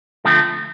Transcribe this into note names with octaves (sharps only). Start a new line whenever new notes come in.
D3 F3 A3 C4